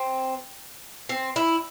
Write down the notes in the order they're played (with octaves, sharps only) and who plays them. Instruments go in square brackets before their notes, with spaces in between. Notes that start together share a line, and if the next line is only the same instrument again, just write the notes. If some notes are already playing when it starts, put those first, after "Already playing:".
Already playing: [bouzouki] C4
C4
E4